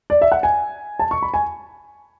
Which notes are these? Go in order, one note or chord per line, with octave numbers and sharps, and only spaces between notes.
D5
E5
F#5
G#5
A5
C#6
B5
G#5